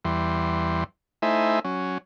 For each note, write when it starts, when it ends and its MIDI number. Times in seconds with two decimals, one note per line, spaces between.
0.05 0.84 40
0.05 0.84 52
0.05 0.84 55
0.05 0.84 84
1.22 1.59 57
1.22 1.59 63
1.22 1.59 64
1.22 1.59 72
1.22 1.59 76
1.22 1.59 80
1.65 1.98 54
1.65 1.98 61